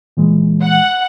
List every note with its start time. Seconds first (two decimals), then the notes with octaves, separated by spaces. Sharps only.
0.17 A#2 E3 G#3
0.63 F#5